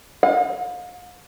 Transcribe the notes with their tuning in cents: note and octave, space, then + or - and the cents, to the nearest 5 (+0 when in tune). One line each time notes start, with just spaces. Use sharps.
F5 +45